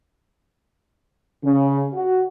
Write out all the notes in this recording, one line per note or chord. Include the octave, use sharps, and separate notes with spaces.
C#3
F#4